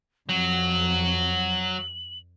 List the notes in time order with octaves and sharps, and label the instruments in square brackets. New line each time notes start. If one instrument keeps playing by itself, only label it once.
[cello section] F2 [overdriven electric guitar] F#3 [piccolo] F#7